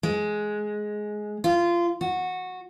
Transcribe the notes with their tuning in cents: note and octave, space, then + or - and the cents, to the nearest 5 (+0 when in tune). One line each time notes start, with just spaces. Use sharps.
G#3 +10
F4 -20
F#4 -15